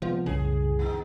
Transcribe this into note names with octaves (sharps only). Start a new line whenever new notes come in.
C3 F3 G#3 B3
C2 F#2 A2 C#3 G#4
D#3 B3 D#4